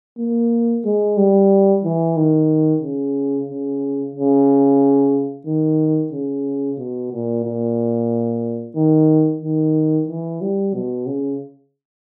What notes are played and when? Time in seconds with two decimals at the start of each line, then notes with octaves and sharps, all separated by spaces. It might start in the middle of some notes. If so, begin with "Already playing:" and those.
0.19 A#3
0.85 G#3
1.17 G3
1.84 E3
2.17 D#3
2.82 C#3
3.49 C#3
4.15 C#3
5.47 D#3
6.12 C#3
6.78 B2
7.12 A#2
7.44 A#2
8.76 D#3
9.42 D#3
10.08 E3
10.41 G3
10.74 B2
11.07 C#3